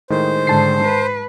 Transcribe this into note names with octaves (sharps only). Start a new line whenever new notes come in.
A2 D#3 G#3 C5
G#2 D3 A5 C7
B4